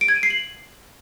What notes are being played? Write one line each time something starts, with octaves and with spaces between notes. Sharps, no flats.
D7
G#6
D#7
C7
F#7